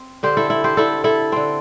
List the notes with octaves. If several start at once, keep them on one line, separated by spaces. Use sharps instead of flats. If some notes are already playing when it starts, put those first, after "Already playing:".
Already playing: C4
D3 C4 G4 C5
E4 A4
E4
G4 C5
D3 C4 E4 A4
E4 A4
D3 C4